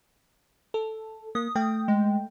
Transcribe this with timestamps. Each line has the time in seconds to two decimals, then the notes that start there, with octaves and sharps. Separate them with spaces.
0.74 A4
1.35 A#3 D#6
1.55 A3 G5
1.88 G#3